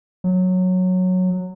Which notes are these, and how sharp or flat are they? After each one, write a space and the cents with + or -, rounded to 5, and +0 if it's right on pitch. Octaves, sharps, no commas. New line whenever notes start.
F#3 -10